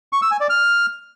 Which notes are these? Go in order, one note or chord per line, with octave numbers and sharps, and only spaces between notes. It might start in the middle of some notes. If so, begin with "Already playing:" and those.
C#6
E6
G#5
D5
F6